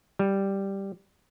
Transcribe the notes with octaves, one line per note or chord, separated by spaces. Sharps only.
G3